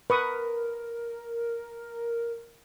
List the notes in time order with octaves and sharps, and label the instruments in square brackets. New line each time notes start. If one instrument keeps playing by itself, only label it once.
[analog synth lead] A#4 [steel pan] B4 C#6 D#6